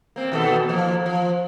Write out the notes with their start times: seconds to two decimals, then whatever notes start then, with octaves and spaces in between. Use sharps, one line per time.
0.16 A#3 C4
0.32 D#2 B2 A4
0.69 F3 A#3
1.06 F3